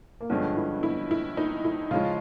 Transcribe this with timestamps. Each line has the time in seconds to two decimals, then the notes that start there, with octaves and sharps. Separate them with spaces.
0.21 A#3
0.30 G2 D3 F3 G#3 B3 C#4
0.57 E4
0.83 E4
1.11 E4
1.37 D#4
1.64 E4
1.91 C#3 F3 G#3 C#4 F4